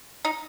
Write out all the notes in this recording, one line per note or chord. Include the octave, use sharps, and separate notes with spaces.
D#4